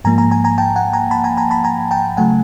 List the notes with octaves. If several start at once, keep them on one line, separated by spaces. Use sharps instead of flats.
G#2 F3 A#3 G#5 A#5
G#5 A#5
G#5 A#5
G#5 A#5
G5 A5
F#5 G#5
G#5 A#5
A5 B5
G#5 A#5
G#5 A#5
A5 B5
G#5 A#5
G5 A5
C#3 F#3 A3 F#5 G#5